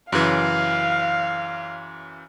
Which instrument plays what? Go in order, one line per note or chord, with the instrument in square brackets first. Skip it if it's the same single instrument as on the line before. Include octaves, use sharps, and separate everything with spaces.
[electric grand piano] F#2 C#3 E3 [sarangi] F5